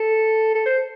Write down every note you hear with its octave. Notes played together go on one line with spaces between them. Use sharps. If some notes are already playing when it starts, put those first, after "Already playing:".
Already playing: A4
A4
C5